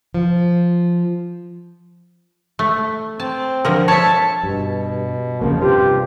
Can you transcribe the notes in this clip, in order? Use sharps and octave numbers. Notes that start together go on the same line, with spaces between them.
F3
A3
C4 A5
D3 F3 A#4
C#5 E5 A5
G2 B2
E2 C#3 F3 A#3
G2 C3 F4 G4